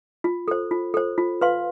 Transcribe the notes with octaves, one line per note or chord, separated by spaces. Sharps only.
F4
A4 C5
F4
A4 C5
F4
B4 F5 C6